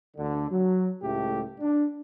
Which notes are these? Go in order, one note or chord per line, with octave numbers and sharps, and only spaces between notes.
D2 D3
F#3
C#2 A2 A3 G4
D4